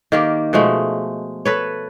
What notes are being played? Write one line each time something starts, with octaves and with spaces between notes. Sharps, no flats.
D#3 A#3 G4
B2 F3 G#3 A3
A4 B4 C#5